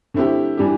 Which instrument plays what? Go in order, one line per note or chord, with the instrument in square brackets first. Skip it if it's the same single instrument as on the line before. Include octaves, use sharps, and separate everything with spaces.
[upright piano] D3 A3 C4 E4 G4
E3 G3 D4 G4